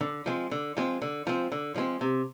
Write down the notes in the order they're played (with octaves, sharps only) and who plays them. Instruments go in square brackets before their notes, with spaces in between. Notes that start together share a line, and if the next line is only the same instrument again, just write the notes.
[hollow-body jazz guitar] D3
F3 G#3 C4
D3
F3 G#3 C4
D3
F3 G#3 C4
D3
F3 G#3 C4
C3